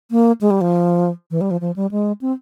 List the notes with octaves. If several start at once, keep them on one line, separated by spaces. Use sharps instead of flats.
A#3
G#3
G3
F3
E3
G3
F3
F3
G3
G#3
C4